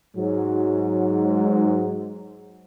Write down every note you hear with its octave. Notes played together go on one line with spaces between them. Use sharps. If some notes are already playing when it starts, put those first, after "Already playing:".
G#2 F#3